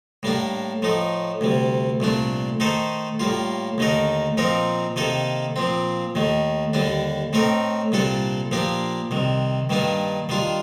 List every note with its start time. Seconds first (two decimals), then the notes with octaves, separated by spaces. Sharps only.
0.23 A2 G3 A#3 D4
0.82 A2 F3 A3 D#4
1.41 D2 C3 G3
2.00 C2 A#2 A3 D4
2.60 D#3 A3 D#4 A4 C5
3.20 A2 G3 A#3 F4
3.78 D#2 D3 A3 D#4 A#4
4.37 A#2 F3 C4 D#4 A#4
4.96 C3 D#3 A#3 D#4 A4
5.56 A#2 F3 C4
6.15 D#2 D#3 A3
6.73 D#2 D3 G3 D4
7.33 A2 A3 C4 D#4 A#4
7.92 C2 A#2 G3 D4 A4
8.51 A#2 F3 A#3 D4 G4
9.11 C2 C3 D#3
9.70 G2 D#3 G3 A#3 D4
10.29 D#3 G3 D4 F4